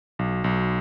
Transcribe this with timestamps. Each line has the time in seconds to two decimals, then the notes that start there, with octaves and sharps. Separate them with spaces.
0.19 B1
0.44 B1